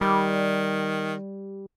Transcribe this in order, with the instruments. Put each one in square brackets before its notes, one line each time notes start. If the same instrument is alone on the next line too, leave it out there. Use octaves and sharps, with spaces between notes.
[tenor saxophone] D#3 [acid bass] G3